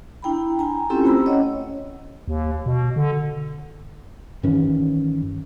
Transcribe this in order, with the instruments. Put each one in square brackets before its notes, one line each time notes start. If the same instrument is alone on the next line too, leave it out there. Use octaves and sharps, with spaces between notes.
[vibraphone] D4 E4 G5 A#5 B5
G5 G#5 A#5
C4 C#4 E4 F4 G4 A4
A3 C5 G5 A#5 B5 E6
C#4 C#5 D#5 F#5
[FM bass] D#2
B2
D3
[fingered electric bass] G2 D#3 E3 C#4